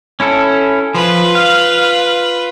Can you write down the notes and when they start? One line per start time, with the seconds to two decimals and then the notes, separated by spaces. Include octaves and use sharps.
0.20 C#4 E4 A4
0.95 F3 F4 B4
1.35 F5